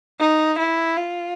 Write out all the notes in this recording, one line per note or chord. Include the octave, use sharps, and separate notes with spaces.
D#4
E4
F4